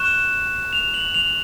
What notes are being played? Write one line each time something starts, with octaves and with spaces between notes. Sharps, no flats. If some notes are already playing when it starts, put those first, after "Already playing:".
Already playing: C#6 F#6 E7
F7
F#7
F7